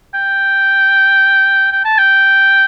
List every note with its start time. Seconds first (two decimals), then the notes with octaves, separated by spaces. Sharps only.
0.14 G5
1.72 G5
1.85 A5
1.98 G5